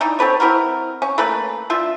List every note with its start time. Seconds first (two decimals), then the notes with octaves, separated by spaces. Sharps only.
0.01 E3 D4 D#4
0.19 C4 A4 B4 C#5
0.40 C4 E4 F#4 A#4
1.02 C#4
1.18 A3 A#3 C#4 B4
1.70 D4 F4 E5